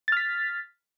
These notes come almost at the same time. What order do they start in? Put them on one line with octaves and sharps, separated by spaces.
A6 F6 B6